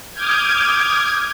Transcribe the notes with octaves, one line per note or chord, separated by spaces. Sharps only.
D6 D#6 F6 G6 G#6